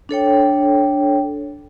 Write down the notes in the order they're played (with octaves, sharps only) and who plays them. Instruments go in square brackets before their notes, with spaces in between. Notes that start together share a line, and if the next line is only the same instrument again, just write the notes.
[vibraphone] D4 A4 C#5 G5